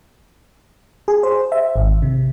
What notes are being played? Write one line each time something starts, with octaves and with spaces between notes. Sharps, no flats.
G#4
C5
E5
G#1
C3